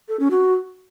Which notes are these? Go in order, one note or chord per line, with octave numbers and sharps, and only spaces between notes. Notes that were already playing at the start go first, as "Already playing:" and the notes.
A4
C#4
F#4